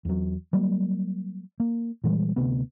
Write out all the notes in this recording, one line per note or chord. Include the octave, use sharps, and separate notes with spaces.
E2 F#3
F#3 G3 A#3
A#3
A#2 E3 G3 G#3
D2 C3 B3